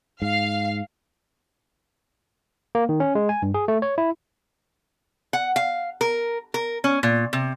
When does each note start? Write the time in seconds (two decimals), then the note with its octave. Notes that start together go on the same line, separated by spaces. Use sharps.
0.22 G#2 F5
2.75 A#3
2.89 D#3
3.00 C#4
3.15 G#3
3.29 G#5
3.42 G2
3.54 G#4
3.68 A3
3.82 C#5
3.98 E4
5.33 F#5
5.56 F5
6.01 A#4
6.54 A#4
6.84 C#4
7.03 A#2
7.33 C3